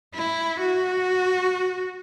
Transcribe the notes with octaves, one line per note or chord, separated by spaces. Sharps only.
E4
F#4